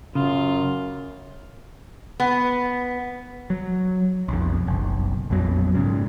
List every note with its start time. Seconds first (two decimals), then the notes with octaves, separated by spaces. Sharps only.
0.15 F#2 C#3 F4
2.20 B3
3.50 F#3
4.28 B1 F2
4.67 F#1 B1
5.30 A#1 F2 B2 F#3
5.74 G#2 C#3